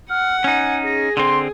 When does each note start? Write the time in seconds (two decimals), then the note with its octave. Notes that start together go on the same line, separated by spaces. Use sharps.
0.10 F#5 F6
0.44 C#4 D#4 G#5
0.86 G#4 A#6
1.17 D3 C4 C6